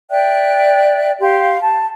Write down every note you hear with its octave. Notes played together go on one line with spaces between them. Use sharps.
D5 E5 G5 F#6
G4 F5 C6
A5